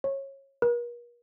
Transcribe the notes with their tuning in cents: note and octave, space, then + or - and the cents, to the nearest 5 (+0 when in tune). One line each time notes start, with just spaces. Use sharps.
C#5 -20
A#4 +45